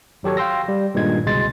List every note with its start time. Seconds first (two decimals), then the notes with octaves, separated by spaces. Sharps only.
0.23 G#1 F#3 G4 A4 C#5
0.37 F5 G5 C6 E6 A#6
0.68 G3
0.95 G2 A#2 D#3 G#3 G#6
1.26 G1 C2 B2 G#3 C6 A6